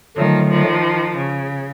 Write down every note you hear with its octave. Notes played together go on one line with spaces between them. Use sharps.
D3 D#3 F3 F#3 A3
D#3 F3
C#3